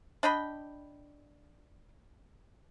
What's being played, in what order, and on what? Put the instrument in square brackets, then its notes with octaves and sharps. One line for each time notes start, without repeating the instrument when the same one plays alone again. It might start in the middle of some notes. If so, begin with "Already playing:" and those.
[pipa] D4 D#5 G5 B5